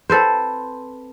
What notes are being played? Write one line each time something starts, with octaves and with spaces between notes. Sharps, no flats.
C4 A4 B4 C5